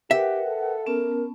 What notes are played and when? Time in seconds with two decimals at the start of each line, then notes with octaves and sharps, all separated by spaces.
0.11 G4 A#4 B4 E5 F#5 G5
0.48 A4
0.86 B3 C#4 A#4 A5